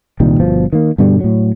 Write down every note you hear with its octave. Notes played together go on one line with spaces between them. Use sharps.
C2 A#2 D#3 G3
G1 B2 F3
D#3 A#3
G2 B2 D3 G3
A2 F#3